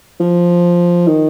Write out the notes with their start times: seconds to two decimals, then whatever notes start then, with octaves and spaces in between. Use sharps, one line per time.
0.20 F3
1.07 D#3